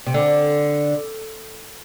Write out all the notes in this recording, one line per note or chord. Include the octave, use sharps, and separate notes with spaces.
C3
D3